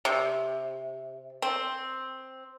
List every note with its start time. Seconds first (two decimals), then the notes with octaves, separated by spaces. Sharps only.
0.05 C3
1.42 C4